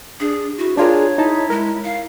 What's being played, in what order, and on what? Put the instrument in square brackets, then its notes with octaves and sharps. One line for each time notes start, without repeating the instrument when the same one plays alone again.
[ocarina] D4 [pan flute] G#4
[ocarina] E4 [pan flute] F#4
[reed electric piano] D4 F4 A#4 [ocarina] G#4 [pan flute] C#5
[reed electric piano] D#4 A5 [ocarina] E4
[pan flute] G#3 [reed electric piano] A#4
[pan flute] F5